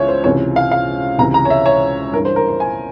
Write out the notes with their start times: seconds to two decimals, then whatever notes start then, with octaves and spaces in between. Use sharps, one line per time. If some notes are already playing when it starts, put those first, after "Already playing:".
Already playing: C#2 C#3 E3 C#5 E5
0.08 C5
0.24 C#2 C3 E3 C#5
0.56 F5
0.71 F5
1.18 C#2 C3 E3 A#5
1.34 A#5
1.45 C#5
1.50 E5
1.66 C#5
2.12 G2 A#4
2.16 E3
2.25 C5
2.36 A#4
2.49 C5
2.60 G#5